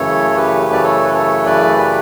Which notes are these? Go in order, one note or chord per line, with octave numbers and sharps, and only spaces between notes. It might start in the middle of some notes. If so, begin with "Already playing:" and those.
Already playing: F#2 C#3 E3 A3 A4 C#5
C#5
G4 B4
D5
A4 C#5
B4
A4 C#5
B4 D5
G4 B4